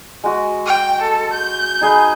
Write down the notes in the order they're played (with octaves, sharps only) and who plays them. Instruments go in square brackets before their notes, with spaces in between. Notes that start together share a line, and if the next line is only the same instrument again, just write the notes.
[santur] G#3 F#4
[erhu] G5
A4
G6
[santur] D#4 G#4 B4